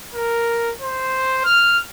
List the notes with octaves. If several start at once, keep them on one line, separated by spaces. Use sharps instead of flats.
A#4
C5
F6